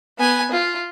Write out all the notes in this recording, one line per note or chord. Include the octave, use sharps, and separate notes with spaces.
B3 G#5
F4